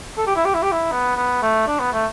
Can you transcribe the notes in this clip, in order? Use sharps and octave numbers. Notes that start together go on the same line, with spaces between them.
A4
G4
E4
G4
E4
G4
E4
B3
B3
A3
D4
B3
A3